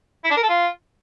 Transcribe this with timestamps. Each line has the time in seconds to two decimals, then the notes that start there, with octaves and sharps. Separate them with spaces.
0.24 E4
0.31 D4
0.37 A#4
0.43 A4
0.49 F4